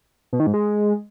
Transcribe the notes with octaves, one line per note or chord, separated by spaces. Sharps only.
B2
D#3
G#2
G#3